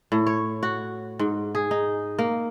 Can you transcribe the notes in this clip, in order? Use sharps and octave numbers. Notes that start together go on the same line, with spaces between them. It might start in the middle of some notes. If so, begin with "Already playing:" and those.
A2
C#5
F#4
G#2
G#4
D#4
A#3